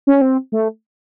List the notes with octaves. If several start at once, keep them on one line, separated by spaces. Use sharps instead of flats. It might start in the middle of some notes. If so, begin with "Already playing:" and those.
C#4
C4
A3